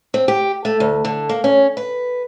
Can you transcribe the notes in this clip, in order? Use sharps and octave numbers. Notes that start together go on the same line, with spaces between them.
C4
G4
A3
D2
D3
A#3
C#4
B4